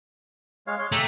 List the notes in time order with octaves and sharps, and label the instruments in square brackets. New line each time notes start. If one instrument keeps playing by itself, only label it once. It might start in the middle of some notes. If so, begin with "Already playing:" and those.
[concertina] G#3 C#5 F5
C#5 C6
[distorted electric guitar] A3 [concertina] G4 A#5 E6